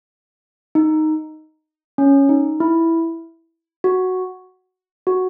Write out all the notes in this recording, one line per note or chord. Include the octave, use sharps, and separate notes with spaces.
D#4
C#4
D#4
E4
F#4
F#4